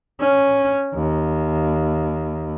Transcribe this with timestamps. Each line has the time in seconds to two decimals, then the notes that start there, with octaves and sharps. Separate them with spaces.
0.20 C#4
0.94 D#2